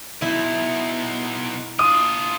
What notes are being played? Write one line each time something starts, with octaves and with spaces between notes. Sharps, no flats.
B2 D#4 E4
D4 F4 D#6